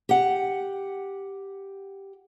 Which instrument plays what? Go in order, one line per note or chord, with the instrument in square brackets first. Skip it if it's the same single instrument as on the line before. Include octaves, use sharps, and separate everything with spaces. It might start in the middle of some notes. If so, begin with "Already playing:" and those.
[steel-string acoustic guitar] G4 F#5